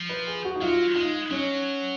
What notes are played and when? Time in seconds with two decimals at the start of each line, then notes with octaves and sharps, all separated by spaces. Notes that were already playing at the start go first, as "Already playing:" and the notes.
Already playing: F3
0.09 B4
0.27 G#4
0.45 F#4
0.56 D#4
0.61 F#3 F4
0.95 G#3 D#4
1.31 F#3 C#4